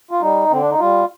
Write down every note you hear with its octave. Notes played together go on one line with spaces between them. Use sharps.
F4
G3 D#4
D3 C4
D4
D#4
G3 F4